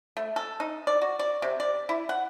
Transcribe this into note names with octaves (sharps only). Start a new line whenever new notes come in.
A3
A4
D#4
D5
F#4
D5
C3
D5
E4
F#5